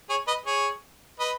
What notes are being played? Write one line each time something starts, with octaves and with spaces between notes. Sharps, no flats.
G#4 C#5
B4 D#5
G#4 C#5
B4 D#5